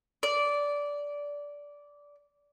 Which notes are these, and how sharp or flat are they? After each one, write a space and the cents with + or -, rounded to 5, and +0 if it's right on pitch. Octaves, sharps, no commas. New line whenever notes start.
D5 -15